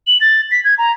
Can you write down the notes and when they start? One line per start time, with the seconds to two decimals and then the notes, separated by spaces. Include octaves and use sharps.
0.07 F#7
0.21 A6
0.51 B6
0.64 G#6
0.78 A#5